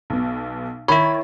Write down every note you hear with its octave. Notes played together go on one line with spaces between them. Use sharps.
B1 B2
D#3 E4 C#5 B5